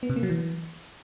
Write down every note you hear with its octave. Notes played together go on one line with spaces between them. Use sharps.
B3
C3
A#3
F#3
E3